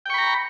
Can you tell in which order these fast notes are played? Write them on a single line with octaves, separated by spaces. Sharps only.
G5 C#6 B5 A#5